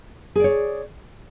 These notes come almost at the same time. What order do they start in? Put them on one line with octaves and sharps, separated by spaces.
G#4 D5 C#5